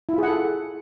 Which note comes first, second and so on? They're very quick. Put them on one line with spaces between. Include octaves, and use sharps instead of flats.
E4 F4 G#4 F#5 A4